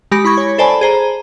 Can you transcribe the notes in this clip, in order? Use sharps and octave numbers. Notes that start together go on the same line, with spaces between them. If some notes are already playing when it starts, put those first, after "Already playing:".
G#3 G4 B5 A#6
E4 B5 C#6 G#6
C#5
A4 C5 D5 G#5 A5 B5
G#4 C5 A#5